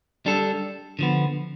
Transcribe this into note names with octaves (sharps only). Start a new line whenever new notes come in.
G3 D4 A4
D3 F3 B3